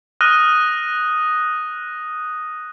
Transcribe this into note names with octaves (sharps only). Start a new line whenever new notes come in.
D#6 F6 F#6 A#6 D#7